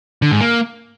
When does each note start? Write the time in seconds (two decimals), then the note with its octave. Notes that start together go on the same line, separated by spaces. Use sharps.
0.22 D3
0.31 G#2
0.41 A#3